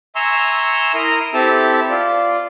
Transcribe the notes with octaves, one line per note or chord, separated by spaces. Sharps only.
E5 G#5 A#5 C6 C#6 E6
E4 A#4 A#5 C6 D#6
C4 E4 G4 A4 E5 A5
F4 D5